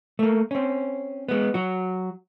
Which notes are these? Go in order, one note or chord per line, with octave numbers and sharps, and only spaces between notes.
A3 A#3
C4 C#4
G#3 B3
F#3 F#4